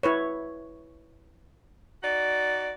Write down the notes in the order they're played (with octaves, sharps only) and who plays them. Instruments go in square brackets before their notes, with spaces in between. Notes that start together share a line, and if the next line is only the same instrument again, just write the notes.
[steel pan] E4 B4 C#5
[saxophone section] D#4 F#4 D5